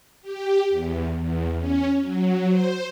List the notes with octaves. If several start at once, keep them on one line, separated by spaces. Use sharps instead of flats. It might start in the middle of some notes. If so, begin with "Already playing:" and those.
G4
E2
E2
C#4
F#3
C5